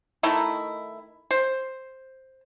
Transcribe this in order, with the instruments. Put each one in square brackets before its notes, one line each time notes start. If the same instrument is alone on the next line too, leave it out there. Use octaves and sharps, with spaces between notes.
[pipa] D#3 A3 D#4 E4
C5